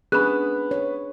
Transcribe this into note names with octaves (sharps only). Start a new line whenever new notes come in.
B3 C#4 D4 G#4 B5 F#6
C#5